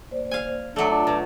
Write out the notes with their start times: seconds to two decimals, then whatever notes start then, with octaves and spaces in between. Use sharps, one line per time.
0.11 A#3 C5 D5
0.31 F5 G#5
0.76 F#3 A3 D4
0.90 D4 F4 C#5
1.07 B2